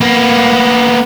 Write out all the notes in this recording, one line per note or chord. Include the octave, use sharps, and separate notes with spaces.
A#3 B3